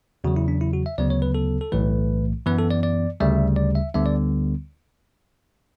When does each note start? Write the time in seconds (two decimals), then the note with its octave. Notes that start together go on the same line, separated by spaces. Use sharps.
0.24 E2 C#3 F#3 F#4
0.36 E4
0.48 D4
0.61 E4
0.73 F#4
0.86 E5
0.98 D2 C#3 F#3 B3 D5
1.10 C#5
1.22 B4
1.35 A4
1.61 A4
1.72 B1 A2 E3 A3 B4
2.46 F#2 E3 B3 B4
2.58 A4
2.71 D5
2.83 D5
3.20 D2 C#3 G3 E5
3.56 D5
3.75 E5
3.94 D2 D3 G3 B3 E5
4.06 D5